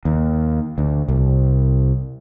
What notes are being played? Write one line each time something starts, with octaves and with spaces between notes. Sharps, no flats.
D#2
D2
C2